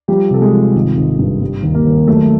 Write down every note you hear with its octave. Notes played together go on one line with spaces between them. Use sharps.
F3 G3 G4
C3 A4
G#3 G#4
F3
G#1
G#1
G2
G3
D#2
A#3 A#4
D#2
F#3 A3 A4